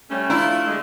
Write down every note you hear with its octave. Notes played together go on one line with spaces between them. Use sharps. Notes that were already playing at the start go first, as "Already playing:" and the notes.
G3 A3 C#4
F3 D4 E4 F4 F5 A#5
D3 G3 G#3